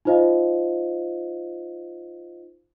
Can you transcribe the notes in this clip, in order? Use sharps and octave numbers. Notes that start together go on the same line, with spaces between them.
D#4 F4 C5 D#5 F5